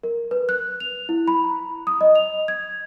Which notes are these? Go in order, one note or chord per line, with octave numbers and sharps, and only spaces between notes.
A#4
B4
F#6
F7
E4
B5
A#5
D#6
D#5
F7
G#6